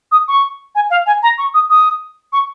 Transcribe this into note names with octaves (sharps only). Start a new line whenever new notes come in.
D#6
C#6
G#5
F5
G#5
A#5
C#6
D#6
D#6
C#6